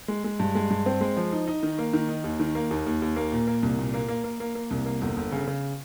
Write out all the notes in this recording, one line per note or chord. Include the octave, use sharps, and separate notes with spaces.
G#3
G#3
G2
G#3
G2
C4
G#3
F3
D#4
D#4
D#3
A#3
D#3
D#4
D#2
D#3
A#3
D#2
D#2
D#2
A#3
A#2
A#3
C2
A#2
A#3
A#3
A#3
A#3
A#3
C2
A#3
G1
G1
C#3
C#3